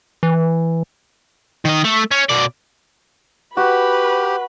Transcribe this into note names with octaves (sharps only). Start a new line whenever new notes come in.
E3
D#3 D#5
A3
C#4
B2 D5
F#4 G4 B4 B5